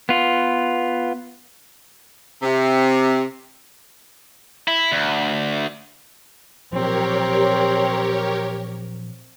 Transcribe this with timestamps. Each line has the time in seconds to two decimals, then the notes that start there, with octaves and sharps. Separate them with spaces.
0.09 B3 F4
2.42 C3
4.68 E4
4.92 D2
6.72 A#2 F3 F#3 C4 G4 A#4 C#5